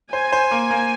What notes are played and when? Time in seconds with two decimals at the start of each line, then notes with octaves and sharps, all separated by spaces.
0.13 C5 G#5
0.32 C5
0.51 A#3
0.71 A#3